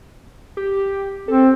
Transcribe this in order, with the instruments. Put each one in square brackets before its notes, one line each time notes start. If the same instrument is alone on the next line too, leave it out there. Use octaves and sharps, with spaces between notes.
[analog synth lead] G4
[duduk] C4 [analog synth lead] A4